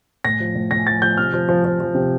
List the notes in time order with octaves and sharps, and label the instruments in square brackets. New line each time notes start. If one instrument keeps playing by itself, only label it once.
[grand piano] A2 A#6
F3
A2
A2 A#6
F3 A6
F3 G6
C3 F6
F3
F3
F3
F3
C3